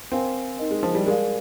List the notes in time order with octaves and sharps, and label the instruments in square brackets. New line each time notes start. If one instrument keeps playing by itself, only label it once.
[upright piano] C4 [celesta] A#4 F5 G#5
[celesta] D#4 A#4 D#5
[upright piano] G#3
F3
G3
[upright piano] G#3 [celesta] A#4 D5 F5